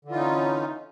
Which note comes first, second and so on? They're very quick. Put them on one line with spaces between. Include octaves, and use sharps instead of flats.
D3 E3 F4 D#4 C#4